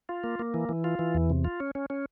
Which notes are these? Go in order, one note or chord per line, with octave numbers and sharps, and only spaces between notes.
F4
A#3
A#3
E3
E3
F4
E3
E2
C3
F4
C#4
C#4
C#4